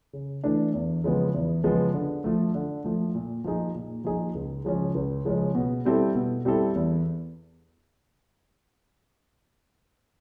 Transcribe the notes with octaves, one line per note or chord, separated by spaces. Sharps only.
C#3
E3 A3 D4
E2
C#3 F3 G#3 B3
E2
C#3 F3 G#3 B3
D3
F3 A3
D3
F3 A3
A#2
F3 A#3 D#4 G#4
A#2
F3 A#3 D#4 G#4
C#2
C#3 F3 G#3 C#4
C#2
C#3 F3 G#3 C#4
B2
G3 C4 E4 A4
B2
G3 C4 E4 A4
E2